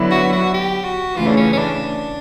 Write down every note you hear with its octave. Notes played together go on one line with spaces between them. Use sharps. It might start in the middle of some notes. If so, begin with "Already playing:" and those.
Already playing: D3 F#3 B3 E4
F#4
F#4
G4
F#4
C#3 E3 A3 F4
D4
C#4
C#4
D4